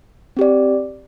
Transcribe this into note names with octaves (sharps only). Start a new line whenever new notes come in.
C4 G4 D5